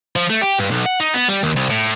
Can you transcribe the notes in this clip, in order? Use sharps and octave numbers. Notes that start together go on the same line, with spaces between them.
F3
A3
G4
G2
B1
F#5
D#4
B3
G3
D#2
C2
A2